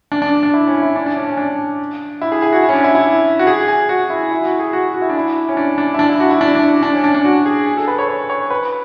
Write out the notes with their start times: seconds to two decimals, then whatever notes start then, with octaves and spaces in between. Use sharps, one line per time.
0.12 D4
0.22 D4
0.43 D4
0.54 E4
0.68 C#4
0.82 E4
0.96 D4
1.06 D4
1.16 C#4
1.27 C#4
1.37 D4
2.21 E4
2.32 G#4
2.42 G#4
2.52 F#4
2.63 E4
2.69 C#4
2.74 D4
2.84 E4
2.95 E4
3.39 F#4
3.47 G#4
3.68 G#4
3.89 F#4
4.10 E4
4.32 E4
4.45 F#4
4.59 G#4
4.73 F#4
4.94 F#4
5.02 E4
5.09 D4
5.18 E4
5.49 C#4
5.57 D4
5.78 D4
5.94 E4
5.99 D4
6.10 E4
6.20 F#4
6.31 E4
6.41 D4
6.55 D4
6.83 D4
6.93 C#4
7.04 D4
7.14 D4
7.25 F#4
7.46 G#4
7.66 G#4
7.77 A4
7.88 B4
7.98 C#5
8.09 C#5
8.30 C#5
8.50 B4